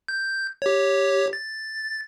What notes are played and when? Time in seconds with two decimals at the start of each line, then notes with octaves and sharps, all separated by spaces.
0.08 G6
0.62 G4 C#5
1.33 A6